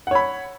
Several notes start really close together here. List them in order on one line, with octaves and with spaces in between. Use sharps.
F#5 C#5 B5